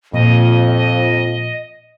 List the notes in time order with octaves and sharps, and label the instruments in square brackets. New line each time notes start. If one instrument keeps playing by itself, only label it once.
[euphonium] F2 [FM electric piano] A#2 [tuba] F3 [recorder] D#5